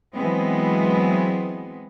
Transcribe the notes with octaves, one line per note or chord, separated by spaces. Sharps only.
E3 F#3 G#3 B3 C4